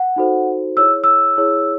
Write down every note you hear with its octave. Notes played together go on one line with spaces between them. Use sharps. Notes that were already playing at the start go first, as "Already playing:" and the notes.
Already playing: F#5
D#4 F#4 A4 C5
E4 G#4 C#5 E6
E6
E4 G#4 C#5